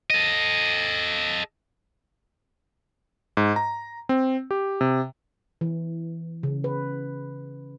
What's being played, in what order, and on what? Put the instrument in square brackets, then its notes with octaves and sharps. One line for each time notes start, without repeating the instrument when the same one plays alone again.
[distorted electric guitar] A4 D#5
[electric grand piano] G#2
A#5
C4
G4
C3
[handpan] E3
C#3
B4